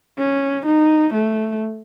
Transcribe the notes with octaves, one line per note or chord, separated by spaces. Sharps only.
C#4
D#4
A3